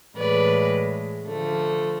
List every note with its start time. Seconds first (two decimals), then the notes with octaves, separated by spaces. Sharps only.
0.17 A2 E3 G#3 B4 D5
1.28 D3 F3 A3